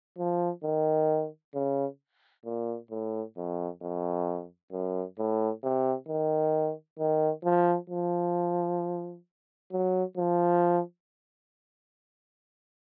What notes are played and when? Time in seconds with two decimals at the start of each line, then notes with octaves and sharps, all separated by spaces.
0.18 F3
0.64 D#3
1.54 C#3
2.45 A#2
2.91 A2
3.37 F2
3.82 F2
4.72 F#2
5.18 A2
5.63 C3
6.09 D#3
6.99 D#3
7.44 F3
7.90 F3
9.72 F#3
10.17 F3